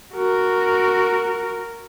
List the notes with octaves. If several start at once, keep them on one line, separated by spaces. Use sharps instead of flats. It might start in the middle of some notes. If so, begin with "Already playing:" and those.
F#4 A#4